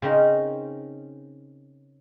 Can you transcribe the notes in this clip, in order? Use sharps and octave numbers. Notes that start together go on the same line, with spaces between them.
C#3 C4 C#4 D#4 A#4